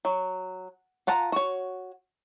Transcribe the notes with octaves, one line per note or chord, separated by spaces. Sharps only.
F#3
F4 F#5 A5 A#5
F#4 C#5